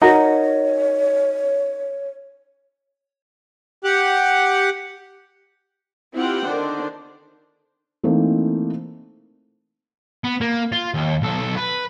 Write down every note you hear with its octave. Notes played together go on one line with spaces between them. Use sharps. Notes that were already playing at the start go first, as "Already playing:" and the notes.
D#4 F#4 A#4 C#5
G4 F#5
C4 E4 F4 G4 F#5 G5
D3 D#3 D4 C5
E3 A3 A#3 C4 D#4
B3
A#3
F4
D#2
B1 A4
B4